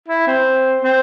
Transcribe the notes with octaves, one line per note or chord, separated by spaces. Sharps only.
E4
C4
C4